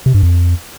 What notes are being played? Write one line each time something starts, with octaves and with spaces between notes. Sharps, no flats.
C3
G2
F2